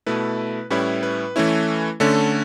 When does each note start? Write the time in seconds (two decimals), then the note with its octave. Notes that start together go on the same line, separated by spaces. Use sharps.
0.06 B2 A3 E4 B4
0.70 A2 G3 C#4 E4 B4
1.03 B4
1.36 E3 A3 C#4 E4
2.00 D3 A3 C#4 A4